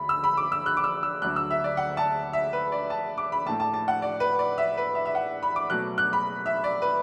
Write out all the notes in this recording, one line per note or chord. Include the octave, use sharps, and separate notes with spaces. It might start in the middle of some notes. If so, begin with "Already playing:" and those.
Already playing: D2 D3 B5
E6
B5
D6
E6
F#6
D6
E6
E6
D2 D3 F#3 A3 F#6
E6
E5
D5
F#5
A5
E5
B4
D5
A5
D6
B5
A2 A3 A5
A5
A5
F#5
D5
B4
D5
E5
B4
E5
E5
F#5
B5
D6
B2 F#3 A3 F#6
F#6
B5
E5
D5
B4